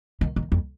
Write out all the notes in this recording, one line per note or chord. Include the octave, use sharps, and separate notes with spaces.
D#3
D#3
F2